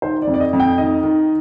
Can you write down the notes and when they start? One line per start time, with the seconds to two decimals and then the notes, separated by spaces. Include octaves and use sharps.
0.02 D#3 C5
0.22 D5
0.27 F2
0.34 D5
0.40 D#5
0.53 F2
0.60 G5
0.78 D#3 D#5
1.03 D#3